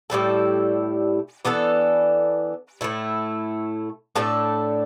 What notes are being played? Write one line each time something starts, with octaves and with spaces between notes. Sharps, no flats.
A2 G3 E4 A4
E3 B3 D4 A4
A2 A3 E4
A2 A3 D4 A4